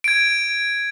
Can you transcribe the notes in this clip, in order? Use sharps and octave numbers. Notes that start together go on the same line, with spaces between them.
G#6 D7